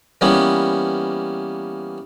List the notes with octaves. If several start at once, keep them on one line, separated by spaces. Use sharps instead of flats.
E3 G3 A#3 B3 C#4